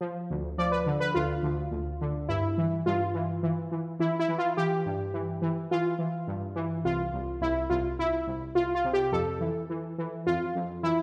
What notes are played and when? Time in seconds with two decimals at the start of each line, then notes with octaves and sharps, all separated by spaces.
0.01 F3
0.30 D2
0.58 F3 D5
0.72 B4
0.86 D3
1.00 B4
1.14 D2 F4
1.43 D2
1.71 D2
2.01 D3
2.29 G2 E4
2.58 E3
2.86 G2 F4
3.14 E3
3.43 E3
3.72 E3
3.99 E3 E4
4.19 E4
4.28 E3
4.38 F4
4.57 E3 G4
4.86 G2
5.14 E3
5.42 E3
5.71 E3 F4
5.99 E3
6.27 G2
6.56 E3
6.84 C2 F4
7.13 C2
7.41 C2 E4
7.70 C2 F4
7.99 C2 E4
8.27 C2
8.55 C2 F4
8.75 F4
8.85 C3
8.93 G4
9.12 F2 A4
9.40 E3
9.70 E3
9.98 E3
10.27 F2 F4
10.55 F2
10.83 E3 E4